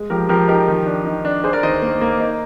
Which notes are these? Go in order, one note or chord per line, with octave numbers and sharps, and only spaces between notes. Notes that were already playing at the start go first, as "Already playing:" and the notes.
Already playing: G#3
F3 G4 A#4
F3 G4 A#4
D#4 G4 A#4
D#3
D4
D#3
D4
D4 G#4 C5
A#4 D5
D#3 C5 D#5
A#3
A#3
D#4